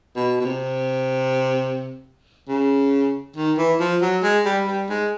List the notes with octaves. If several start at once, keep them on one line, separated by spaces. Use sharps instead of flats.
B2
B2
C3
C#3
D#3
E3
F3
F#3
G#3
G3
G3
G#3